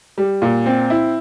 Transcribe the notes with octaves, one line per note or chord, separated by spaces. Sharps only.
G3
A#2
C4
E4